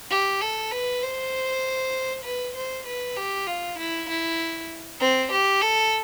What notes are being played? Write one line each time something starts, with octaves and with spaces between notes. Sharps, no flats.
G4
A4
B4
C5
B4
C5
B4
G4
F4
E4
E4
C4
G4
A4